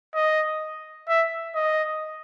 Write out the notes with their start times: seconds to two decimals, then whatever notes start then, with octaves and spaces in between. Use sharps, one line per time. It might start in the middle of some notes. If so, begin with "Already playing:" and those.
0.15 D#5
1.08 E5
1.55 D#5